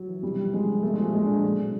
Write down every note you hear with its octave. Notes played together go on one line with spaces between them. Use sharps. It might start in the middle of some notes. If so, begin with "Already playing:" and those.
Already playing: F#3
E3
C3 G3
F3
C3 G#3
F3
A#2 A3
F3 G#3
A#2 G#3
F3 D4
F#3
C3